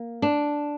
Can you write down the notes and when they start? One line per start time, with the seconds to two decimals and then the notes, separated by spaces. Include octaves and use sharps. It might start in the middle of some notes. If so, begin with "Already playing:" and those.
Already playing: A#3
0.22 D4